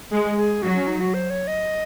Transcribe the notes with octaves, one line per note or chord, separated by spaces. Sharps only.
G#3
G#4
F#3 F#4
C#4
D#4
F#4
C5
C#5
D#5